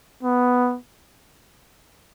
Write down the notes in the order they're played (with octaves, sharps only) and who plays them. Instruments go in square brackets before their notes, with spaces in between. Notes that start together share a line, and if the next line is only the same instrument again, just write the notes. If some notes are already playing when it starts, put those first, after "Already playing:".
[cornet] B3